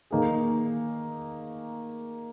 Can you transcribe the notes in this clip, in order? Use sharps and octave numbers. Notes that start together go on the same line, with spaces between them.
D#3 A#3 D#4 G#4